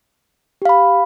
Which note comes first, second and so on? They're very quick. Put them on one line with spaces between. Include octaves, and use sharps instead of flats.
G4 F5 B5